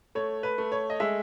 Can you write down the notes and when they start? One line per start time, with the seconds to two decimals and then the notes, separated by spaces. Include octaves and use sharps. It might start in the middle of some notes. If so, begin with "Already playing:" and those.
0.15 A3 C#5
0.43 B4
0.58 A3
0.72 C#5
0.90 D#5
1.00 G#3 E5